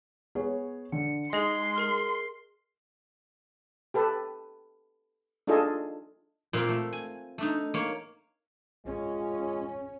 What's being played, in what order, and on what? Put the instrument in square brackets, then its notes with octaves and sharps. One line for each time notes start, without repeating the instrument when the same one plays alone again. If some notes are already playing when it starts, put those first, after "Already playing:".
[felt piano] B3 G#4 C#5
[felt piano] D3 [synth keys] C#7
[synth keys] G#3 [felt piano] D#4 [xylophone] G#4 D#5 [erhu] C6
[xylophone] G#4 A#4 F6
[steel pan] G4 A4 B4
D4 D#4 F4 G#4 A4 D#5
[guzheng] A#2 A#3 C4 F4 F5
A3
G#5
A3 D4 D#4
A#3 C#5
[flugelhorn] G#3 [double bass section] C#4 [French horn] F4